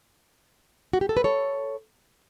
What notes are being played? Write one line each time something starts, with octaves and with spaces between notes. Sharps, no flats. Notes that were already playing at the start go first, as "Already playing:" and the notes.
F#4
G4
A4
B4
A4 C#5